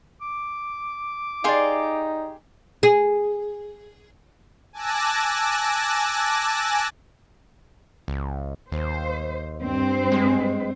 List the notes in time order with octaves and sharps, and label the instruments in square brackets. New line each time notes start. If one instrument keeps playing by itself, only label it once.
[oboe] D6
[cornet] D#4 [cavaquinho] G4 G#4 C6 [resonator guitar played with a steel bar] D5 F5
[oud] G#4
[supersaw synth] G#5 A5 D6 E6 F#6 A#6
[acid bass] C#2
[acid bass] D#2 [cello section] C5
[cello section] G2 C4 C5
[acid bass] G#3